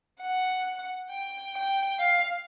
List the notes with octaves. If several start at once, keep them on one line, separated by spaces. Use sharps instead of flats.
F#5
G5
G5
F5